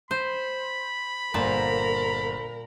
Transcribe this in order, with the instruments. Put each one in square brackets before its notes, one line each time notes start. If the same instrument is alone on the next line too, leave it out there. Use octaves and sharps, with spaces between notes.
[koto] C5 [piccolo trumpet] B5
[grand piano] G1 A#3 C5 [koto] A#2 A5 [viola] A#4 A#5